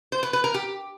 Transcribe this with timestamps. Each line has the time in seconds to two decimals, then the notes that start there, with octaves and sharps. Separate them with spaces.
0.12 C5
0.23 B4
0.33 B4
0.44 A#4
0.54 G4